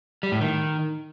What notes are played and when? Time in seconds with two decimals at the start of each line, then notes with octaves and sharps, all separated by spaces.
0.23 G3
0.32 A2
0.41 D#3